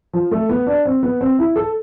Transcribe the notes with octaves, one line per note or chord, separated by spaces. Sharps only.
F3
A3
B3
D4
C4
B3
C4
E4
A4